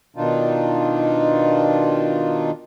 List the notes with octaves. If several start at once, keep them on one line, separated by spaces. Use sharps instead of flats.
B2 D#3 D4 D#4 F4